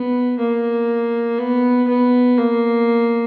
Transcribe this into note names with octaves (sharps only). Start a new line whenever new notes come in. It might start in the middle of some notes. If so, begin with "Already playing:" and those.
Already playing: B3
A#3
B3
B3
A#3